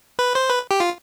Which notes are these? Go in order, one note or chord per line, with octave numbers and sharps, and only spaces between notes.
B4
C5
B4
G4
F4